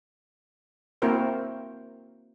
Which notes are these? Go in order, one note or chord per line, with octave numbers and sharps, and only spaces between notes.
A#3 C4 E4 F#4 A#4 C5